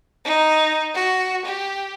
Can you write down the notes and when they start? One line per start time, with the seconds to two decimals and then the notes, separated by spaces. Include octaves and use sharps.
0.25 D#4
0.94 F#4
1.45 G4